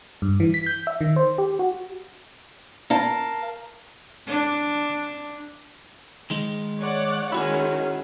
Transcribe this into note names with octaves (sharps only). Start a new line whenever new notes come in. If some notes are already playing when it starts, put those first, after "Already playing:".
G2
E3
B6
G6
E5
D#3
C5
G4
F#4
A#4 F5 A5
D4
D#3 G#3 D#4
C#5 D5 F#5
D#3 G#3 C#4 E4 F#4 G#4